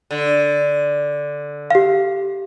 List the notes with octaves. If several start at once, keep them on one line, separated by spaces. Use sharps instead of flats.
D3
G4 F5